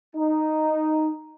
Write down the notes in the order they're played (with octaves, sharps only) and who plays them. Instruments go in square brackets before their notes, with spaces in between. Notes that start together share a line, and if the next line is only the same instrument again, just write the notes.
[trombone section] D#4